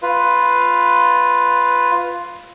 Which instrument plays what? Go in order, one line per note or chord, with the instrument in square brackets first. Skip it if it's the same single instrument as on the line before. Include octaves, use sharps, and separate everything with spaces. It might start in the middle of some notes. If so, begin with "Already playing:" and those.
[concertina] F4 B4